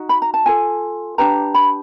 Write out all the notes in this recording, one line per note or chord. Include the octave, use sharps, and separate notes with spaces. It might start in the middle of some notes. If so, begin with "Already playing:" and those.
Already playing: D#4 F#4
B5
A#5
A5
F4 A4 G#5
D4 G4 B4 A#5
B5